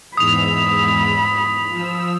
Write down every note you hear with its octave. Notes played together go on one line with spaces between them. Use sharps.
E2 G#2 B5 D#6 E6 F7
F3 E6